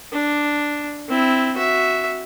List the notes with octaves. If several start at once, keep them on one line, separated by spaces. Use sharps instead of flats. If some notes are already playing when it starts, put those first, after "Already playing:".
D4
C4 E4
F#4 E5